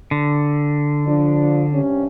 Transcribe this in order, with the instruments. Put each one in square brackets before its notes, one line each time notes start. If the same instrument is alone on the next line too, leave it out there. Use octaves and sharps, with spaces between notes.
[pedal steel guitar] D3
[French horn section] F3 D4
G2 C3 C#4